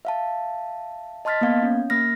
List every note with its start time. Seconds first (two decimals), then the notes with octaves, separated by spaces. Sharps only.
0.05 E5 F5 A5
1.25 D#5 A5 C6 F6 A6 B6
1.41 A#3 B3 F5 G#6
1.63 C#4
1.90 A#3 F6 A#6